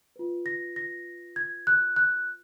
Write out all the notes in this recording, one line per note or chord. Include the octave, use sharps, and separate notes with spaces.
F4 B4
A#6
A#6
G#6
F#6
F#6